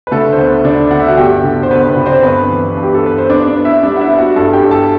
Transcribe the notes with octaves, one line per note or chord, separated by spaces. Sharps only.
B4
D3 A3 A4
C5
D2 B3 B4
D3 D4 D5
D3 F#5
E5
F#4 F#5
G1 G4 G5
D3
C5
D3 B3 B4
B3 B4
D3
C4 C5
G2 B3 B4
E3
G2
G4
A4
B3 B4
C5
B3 D4 D5
D4 D5
B3
E4 E5
G3 D4 D5
F#5
E4 E5
B3
F#4 F#5
G2 A4 A5
G4 G5
G2
A4 A5